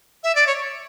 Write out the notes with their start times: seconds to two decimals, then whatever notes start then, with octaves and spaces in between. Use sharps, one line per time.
0.23 E5
0.35 D5
0.47 C#5